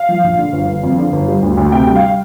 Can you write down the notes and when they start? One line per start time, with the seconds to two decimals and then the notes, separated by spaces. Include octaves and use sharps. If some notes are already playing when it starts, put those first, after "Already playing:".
Already playing: F5
0.09 F3
0.23 A#1
0.39 D3
0.53 G1
0.68 G1
0.83 F2
0.98 D3
1.12 G1
1.28 G3
1.42 D2
1.57 D2
1.72 C3 G5
1.87 G3
1.95 F5